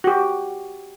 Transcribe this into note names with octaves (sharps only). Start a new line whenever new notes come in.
F#4 G4